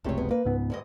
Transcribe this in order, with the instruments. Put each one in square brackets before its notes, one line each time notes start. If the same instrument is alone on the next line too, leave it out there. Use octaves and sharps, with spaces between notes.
[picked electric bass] F#1 C#2 C3 [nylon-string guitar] A3 C#5
[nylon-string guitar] B3
[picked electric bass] A#3 [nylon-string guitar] B4
[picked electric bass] C#2 G#2 B3
[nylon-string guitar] D2 G2 D#5